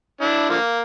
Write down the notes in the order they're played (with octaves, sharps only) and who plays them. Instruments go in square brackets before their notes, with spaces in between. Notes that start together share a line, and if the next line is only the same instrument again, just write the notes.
[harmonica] D4 E4
D3 F3 A#3